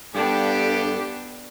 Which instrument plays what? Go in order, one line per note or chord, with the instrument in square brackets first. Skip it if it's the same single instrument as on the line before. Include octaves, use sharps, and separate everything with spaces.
[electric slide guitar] G2 [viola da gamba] B3 D4 [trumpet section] G4 [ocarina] A4